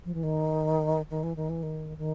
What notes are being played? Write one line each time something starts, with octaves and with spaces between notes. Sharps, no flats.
F3
E3
D#3
D#3
E3
D#3
E3
D#3
D#3